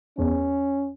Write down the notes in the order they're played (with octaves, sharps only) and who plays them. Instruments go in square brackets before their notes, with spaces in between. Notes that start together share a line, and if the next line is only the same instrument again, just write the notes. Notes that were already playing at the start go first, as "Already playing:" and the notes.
[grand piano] E2 [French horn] C#4